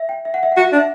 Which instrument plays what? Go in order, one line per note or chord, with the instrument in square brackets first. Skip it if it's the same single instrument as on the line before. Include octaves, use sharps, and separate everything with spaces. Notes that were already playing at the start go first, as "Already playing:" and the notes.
Already playing: [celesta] E5
G5
E5
F#5
E5
F#5
[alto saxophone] F#4
[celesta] E5
[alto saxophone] D4
[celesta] E5